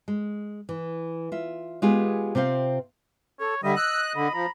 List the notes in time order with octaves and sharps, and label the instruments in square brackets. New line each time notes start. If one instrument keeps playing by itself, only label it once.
[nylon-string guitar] G#3
E3
F4 E5
G#3 B3 F4 G4 G#4
C3 C4 F4 C5 F5
[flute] A4 [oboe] C#5
[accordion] D3 G3 [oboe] D#5 [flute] E5
[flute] E6 [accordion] F#6
[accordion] D3 [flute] B5
[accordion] F3 [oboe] A#5